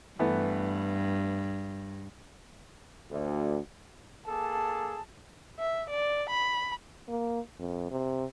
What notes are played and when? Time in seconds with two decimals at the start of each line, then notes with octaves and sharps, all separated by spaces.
0.19 G2 E3 A3 B3
3.10 D2
4.27 A#3 G#4 A4 A5
5.59 E5
5.90 D5
6.29 B5
7.09 A#3
7.59 F2
7.91 C3